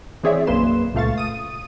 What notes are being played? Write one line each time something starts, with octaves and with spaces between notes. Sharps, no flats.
E3 C4 G#4 C#5 D5 E5
B1 F#2 A#3 B4 C6 E7
C#2 A#2 A3 F5 C#6 A6
D#6 D#7